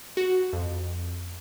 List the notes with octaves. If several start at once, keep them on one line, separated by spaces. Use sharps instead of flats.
F#4
F2